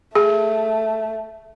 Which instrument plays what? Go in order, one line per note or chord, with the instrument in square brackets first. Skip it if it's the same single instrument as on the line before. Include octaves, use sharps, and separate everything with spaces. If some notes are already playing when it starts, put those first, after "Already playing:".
[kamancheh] A3 [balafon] G#4